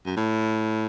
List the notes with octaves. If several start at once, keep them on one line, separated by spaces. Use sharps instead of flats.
F#2
A2